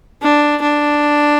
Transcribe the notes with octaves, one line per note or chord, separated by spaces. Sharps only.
D4
D4